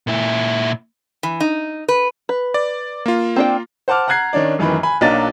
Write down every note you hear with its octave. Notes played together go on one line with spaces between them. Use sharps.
A#2 E4
E3
D#4
B4
B4
D5
A#3 F4
C4 D4 G5
C5 F#5 A5 D6 F6
F#5 A#5 F#6 G#6 C7
D#3 C#4 D4 D5
A1 F#2 D#3 E3 B5
G#5 B5
B1 F#3 A#3 D4 D#4 A6